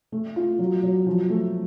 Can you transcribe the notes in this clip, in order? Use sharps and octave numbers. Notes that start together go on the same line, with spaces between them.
A3
F4
F#3
F#3
F3
A3